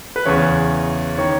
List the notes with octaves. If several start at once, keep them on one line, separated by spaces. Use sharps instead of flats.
B4
E2 C#3 E3 C#5
D#3 C#5